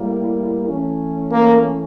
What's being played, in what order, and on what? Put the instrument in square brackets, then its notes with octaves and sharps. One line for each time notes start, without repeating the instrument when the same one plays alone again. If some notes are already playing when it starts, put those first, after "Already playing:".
Already playing: [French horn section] A2 G3 A#3 E4 A#4
E3 A3 C#4
[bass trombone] A#3